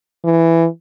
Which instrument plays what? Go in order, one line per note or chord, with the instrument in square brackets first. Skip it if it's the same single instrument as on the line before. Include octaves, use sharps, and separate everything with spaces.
[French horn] E3